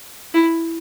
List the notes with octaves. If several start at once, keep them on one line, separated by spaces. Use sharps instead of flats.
E4